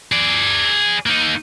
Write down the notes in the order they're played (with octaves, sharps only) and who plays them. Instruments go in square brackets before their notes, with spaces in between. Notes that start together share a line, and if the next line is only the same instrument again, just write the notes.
[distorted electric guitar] G#4 D5
A#3 D#4